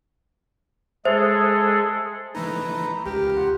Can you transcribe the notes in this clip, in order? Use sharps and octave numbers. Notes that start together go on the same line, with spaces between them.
G#3 G#4 A4 C5 E5
E3 A3 D#4 B4 A#5
C#2 G4 A#4
F4 F#5